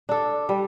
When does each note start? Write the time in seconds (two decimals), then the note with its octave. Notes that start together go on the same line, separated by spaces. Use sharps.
0.09 D4 A4
0.49 G3